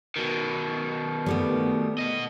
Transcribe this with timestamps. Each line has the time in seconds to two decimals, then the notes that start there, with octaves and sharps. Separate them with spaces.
0.16 B2 D#3
1.26 G3 A3 B3
1.98 B2 D#5